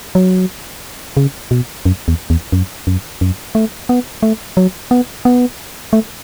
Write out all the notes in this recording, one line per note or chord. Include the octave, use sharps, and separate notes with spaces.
F#3
C#3
B2
F#2
E2
E2
F#2
F#2
F#2
A3
B3
A3
F#3
B3
B3
A3